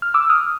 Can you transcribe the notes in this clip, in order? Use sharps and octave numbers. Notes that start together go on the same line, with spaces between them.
F6
D6 E6
D#6 F6